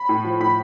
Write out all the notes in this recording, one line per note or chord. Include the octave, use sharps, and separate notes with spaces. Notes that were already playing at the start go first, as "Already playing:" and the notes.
Already playing: B5
A2
F3
A2 B5